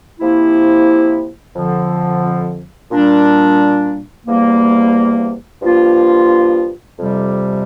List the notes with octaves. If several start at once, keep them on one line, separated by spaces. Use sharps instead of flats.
C3 F3 A#3 E4
F2 D3 F3
A#2 G3 D4
E2 C3 G3 A#3
G2 F3 A#3 F4
F2 C3 G3